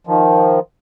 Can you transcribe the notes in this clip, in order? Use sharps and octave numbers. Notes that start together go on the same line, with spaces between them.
D#3 F3